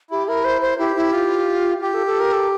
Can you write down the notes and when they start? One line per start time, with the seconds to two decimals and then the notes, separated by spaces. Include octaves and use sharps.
0.11 E4 G4
0.28 E4 A#4
0.45 C5
0.62 C5
0.79 E4 G4
0.96 E4
1.13 F4
1.81 F4 G4
1.94 A4
2.07 A4
2.20 A#4
2.33 A4